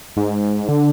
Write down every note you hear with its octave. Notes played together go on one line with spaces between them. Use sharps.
G#2
D3